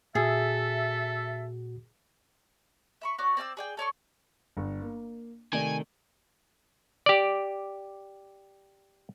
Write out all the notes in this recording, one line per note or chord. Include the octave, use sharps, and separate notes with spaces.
A#2 F#4 G#4 A4 E5
E5 B5 C#6
F#4 C#5 D5
C4 D5 E5 E6
G#4 D5 G5
A4 C#5 D5 C#6
G1
A#3
C3 D#3 A3 D5 G#5
G4 D5